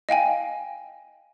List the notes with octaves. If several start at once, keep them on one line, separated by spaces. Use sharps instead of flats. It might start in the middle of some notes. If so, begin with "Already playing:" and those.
D#5 F5 G5 G#5